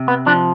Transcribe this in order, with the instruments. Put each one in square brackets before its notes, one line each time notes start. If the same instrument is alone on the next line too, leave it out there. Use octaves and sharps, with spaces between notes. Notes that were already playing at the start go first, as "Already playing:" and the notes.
Already playing: [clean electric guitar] C3
B3
F3 D4